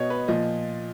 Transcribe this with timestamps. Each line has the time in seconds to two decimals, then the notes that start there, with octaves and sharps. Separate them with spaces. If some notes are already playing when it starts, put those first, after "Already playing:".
Already playing: B2 C#5 D#5
0.10 B4
0.28 A#2 F3 D#5